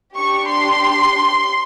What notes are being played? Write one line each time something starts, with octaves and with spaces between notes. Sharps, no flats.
D4 G4 C#6
C6